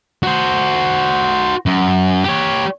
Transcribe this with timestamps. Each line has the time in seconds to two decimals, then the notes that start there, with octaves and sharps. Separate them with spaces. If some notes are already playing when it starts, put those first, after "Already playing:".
0.23 F#4 C5
1.66 F#2
2.24 G4 C#5